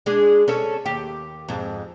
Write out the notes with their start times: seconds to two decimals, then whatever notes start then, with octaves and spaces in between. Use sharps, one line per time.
0.06 G#3 D4 G#4
0.48 C#4 A4 C#5
0.86 D#2 G4
1.48 F2 G#2